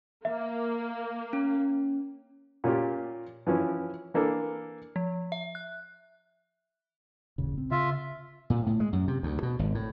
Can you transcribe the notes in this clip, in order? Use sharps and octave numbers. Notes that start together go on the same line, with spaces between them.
A#3 E5
C#4
A#2 C#4 F4 G4
E3 F3 C#4 E4
E3 A#3 D4 A4
F3
E5
F#6
D#1 A1 C#3
C4
C#3 F4 E5
A#2
A2
G#3
F#2
C3
D2
B2
G#1
A2